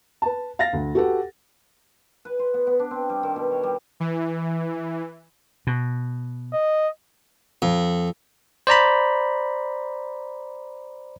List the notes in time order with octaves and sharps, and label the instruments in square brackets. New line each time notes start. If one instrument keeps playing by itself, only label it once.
[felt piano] B4 A5
F5 A6 A#6
D2
F#4 G4 A4 B4 F#5
[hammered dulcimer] B4
C5
B3
B3
D4
C4
G3
D#3
B2
C#5
G3
[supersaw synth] E3
[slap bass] B2
[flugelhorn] D#5
[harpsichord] F2
[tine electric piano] C5 D5 A#5 B5